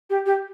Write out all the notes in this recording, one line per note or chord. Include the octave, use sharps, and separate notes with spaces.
G4
G4